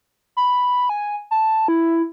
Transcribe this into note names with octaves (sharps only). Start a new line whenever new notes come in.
B5
G#5
A5
E4